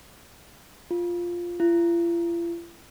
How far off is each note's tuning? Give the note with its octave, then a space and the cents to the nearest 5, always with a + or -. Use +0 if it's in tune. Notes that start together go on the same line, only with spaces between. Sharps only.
F4 +0
F4 -45